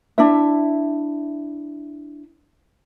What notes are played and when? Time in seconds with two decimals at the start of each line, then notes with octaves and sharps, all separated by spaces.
0.18 D4 E4 E5